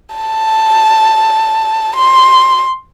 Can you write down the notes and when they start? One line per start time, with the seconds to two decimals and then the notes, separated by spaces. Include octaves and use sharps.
0.15 A5
1.96 C6